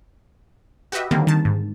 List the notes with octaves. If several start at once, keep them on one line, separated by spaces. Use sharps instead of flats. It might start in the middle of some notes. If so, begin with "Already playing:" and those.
F#4 G4 B4 D#5 E5
D3 D#3 G3 A#3 C4
D#3 A5
G#2